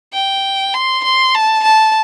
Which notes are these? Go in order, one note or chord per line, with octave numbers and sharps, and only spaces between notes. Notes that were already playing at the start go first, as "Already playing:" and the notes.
G5
C6
C6
A5
A5